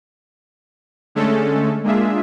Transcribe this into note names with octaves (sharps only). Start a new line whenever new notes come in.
D3 G#3 A3 C#4 A4
G#3 A#3 D4 F4 G#4 E5